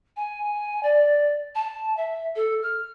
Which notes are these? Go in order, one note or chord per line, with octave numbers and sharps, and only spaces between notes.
G#5
D5
A5
E5
A4
F6